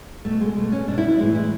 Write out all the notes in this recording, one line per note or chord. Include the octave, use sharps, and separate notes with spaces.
B2 A3
G#3
B2 A3
C#4
B2 D4
E4
E4
A2 E3 G#3
E4